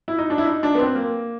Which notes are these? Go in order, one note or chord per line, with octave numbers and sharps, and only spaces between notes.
E4
D#4
D4
E4
D#4
D4
B3
C4
A#3